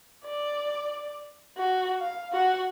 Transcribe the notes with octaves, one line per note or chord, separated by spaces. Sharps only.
D5
F#4
F5
F#4 F#5